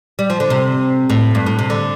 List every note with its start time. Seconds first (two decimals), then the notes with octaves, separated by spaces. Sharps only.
0.19 G3
0.30 F3
0.40 D3
0.50 C3
1.10 A2
1.35 G2
1.46 A2
1.59 C3
1.70 D3